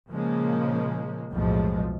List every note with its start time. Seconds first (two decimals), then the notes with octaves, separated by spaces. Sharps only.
0.11 A#2 C#3 F3 G#3 A#3
1.32 B1 F2 A2 F3 G#3 A3